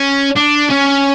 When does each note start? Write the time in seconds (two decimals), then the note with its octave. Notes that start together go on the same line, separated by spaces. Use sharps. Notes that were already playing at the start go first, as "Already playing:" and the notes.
Already playing: C#4
0.36 D4
0.70 C#4